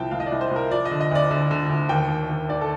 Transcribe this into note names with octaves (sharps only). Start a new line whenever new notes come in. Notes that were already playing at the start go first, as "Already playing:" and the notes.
Already playing: C2 F3 G5 A5
C2 F5
D#5
D5
C2
C5
C2 A#4
F3 D5
D#5
D3
D#5
D2 D5
D3
D3
D2
D#2 G5
D#2
D#2
D#2 D5
A4